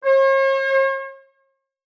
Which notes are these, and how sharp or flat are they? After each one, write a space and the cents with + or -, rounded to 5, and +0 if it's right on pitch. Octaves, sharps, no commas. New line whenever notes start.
C#5 -45